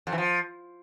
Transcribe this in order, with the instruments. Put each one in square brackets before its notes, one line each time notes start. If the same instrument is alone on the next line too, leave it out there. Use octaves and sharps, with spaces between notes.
[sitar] F2
E3
F3